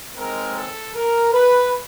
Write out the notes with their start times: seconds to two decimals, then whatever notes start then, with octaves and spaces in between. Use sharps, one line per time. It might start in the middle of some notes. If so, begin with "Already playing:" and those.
0.16 D#2 D#3 G#3 C4 A#4
0.55 A4
0.93 A#4
1.33 B4